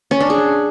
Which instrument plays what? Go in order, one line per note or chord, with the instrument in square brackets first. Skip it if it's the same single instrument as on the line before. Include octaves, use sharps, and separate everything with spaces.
[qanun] C#4
D4
G#4